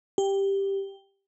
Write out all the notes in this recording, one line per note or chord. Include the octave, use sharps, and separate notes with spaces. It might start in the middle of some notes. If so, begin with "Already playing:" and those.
G4